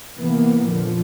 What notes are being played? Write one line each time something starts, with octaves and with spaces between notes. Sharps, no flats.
C3 E3 A#3 B3
F2 A#2 D3 F3